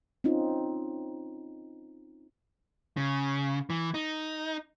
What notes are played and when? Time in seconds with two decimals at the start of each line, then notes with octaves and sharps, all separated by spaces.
0.24 C4 C#4 D#4 F4
2.97 C#3
3.70 E3
3.94 D#4